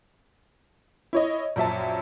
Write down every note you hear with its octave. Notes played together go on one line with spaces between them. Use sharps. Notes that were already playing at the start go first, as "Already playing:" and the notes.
E4 C#5 D#5
A#1 F#2 E5 A5